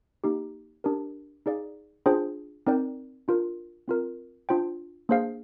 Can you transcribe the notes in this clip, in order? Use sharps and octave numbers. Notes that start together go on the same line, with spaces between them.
A#3 D#4 G4
D4 G4 A#4
D#4 G#4 D5 F5
D4 F4 G#4 C5 G5
C4 D#4 A#4 D5 G5
D4 F4 A#4
C4 F4 A#4
D4 F4 C5 G5
A#3 D4 G#4 C5 F5